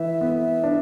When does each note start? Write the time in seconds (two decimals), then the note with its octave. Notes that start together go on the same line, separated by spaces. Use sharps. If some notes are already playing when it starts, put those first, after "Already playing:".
Already playing: E3 E5
0.21 B3
0.64 D4